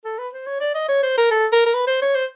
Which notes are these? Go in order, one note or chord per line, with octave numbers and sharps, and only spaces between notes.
A4
B4
C5
C#5
D5
D#5
C#5
C5
A#4
A4
A#4
A#4
B4
C5
C#5
C5